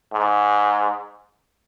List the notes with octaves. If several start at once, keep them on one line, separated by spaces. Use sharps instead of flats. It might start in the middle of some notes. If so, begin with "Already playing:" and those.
G#2